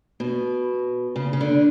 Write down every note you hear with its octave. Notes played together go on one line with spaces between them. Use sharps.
B2
C#3
C#3
D3